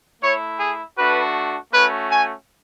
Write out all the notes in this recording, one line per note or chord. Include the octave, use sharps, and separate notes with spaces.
A3 E4 C#5
G#4
A3 D4 F#4 B4
A3 C#4 F#4 B4
G#5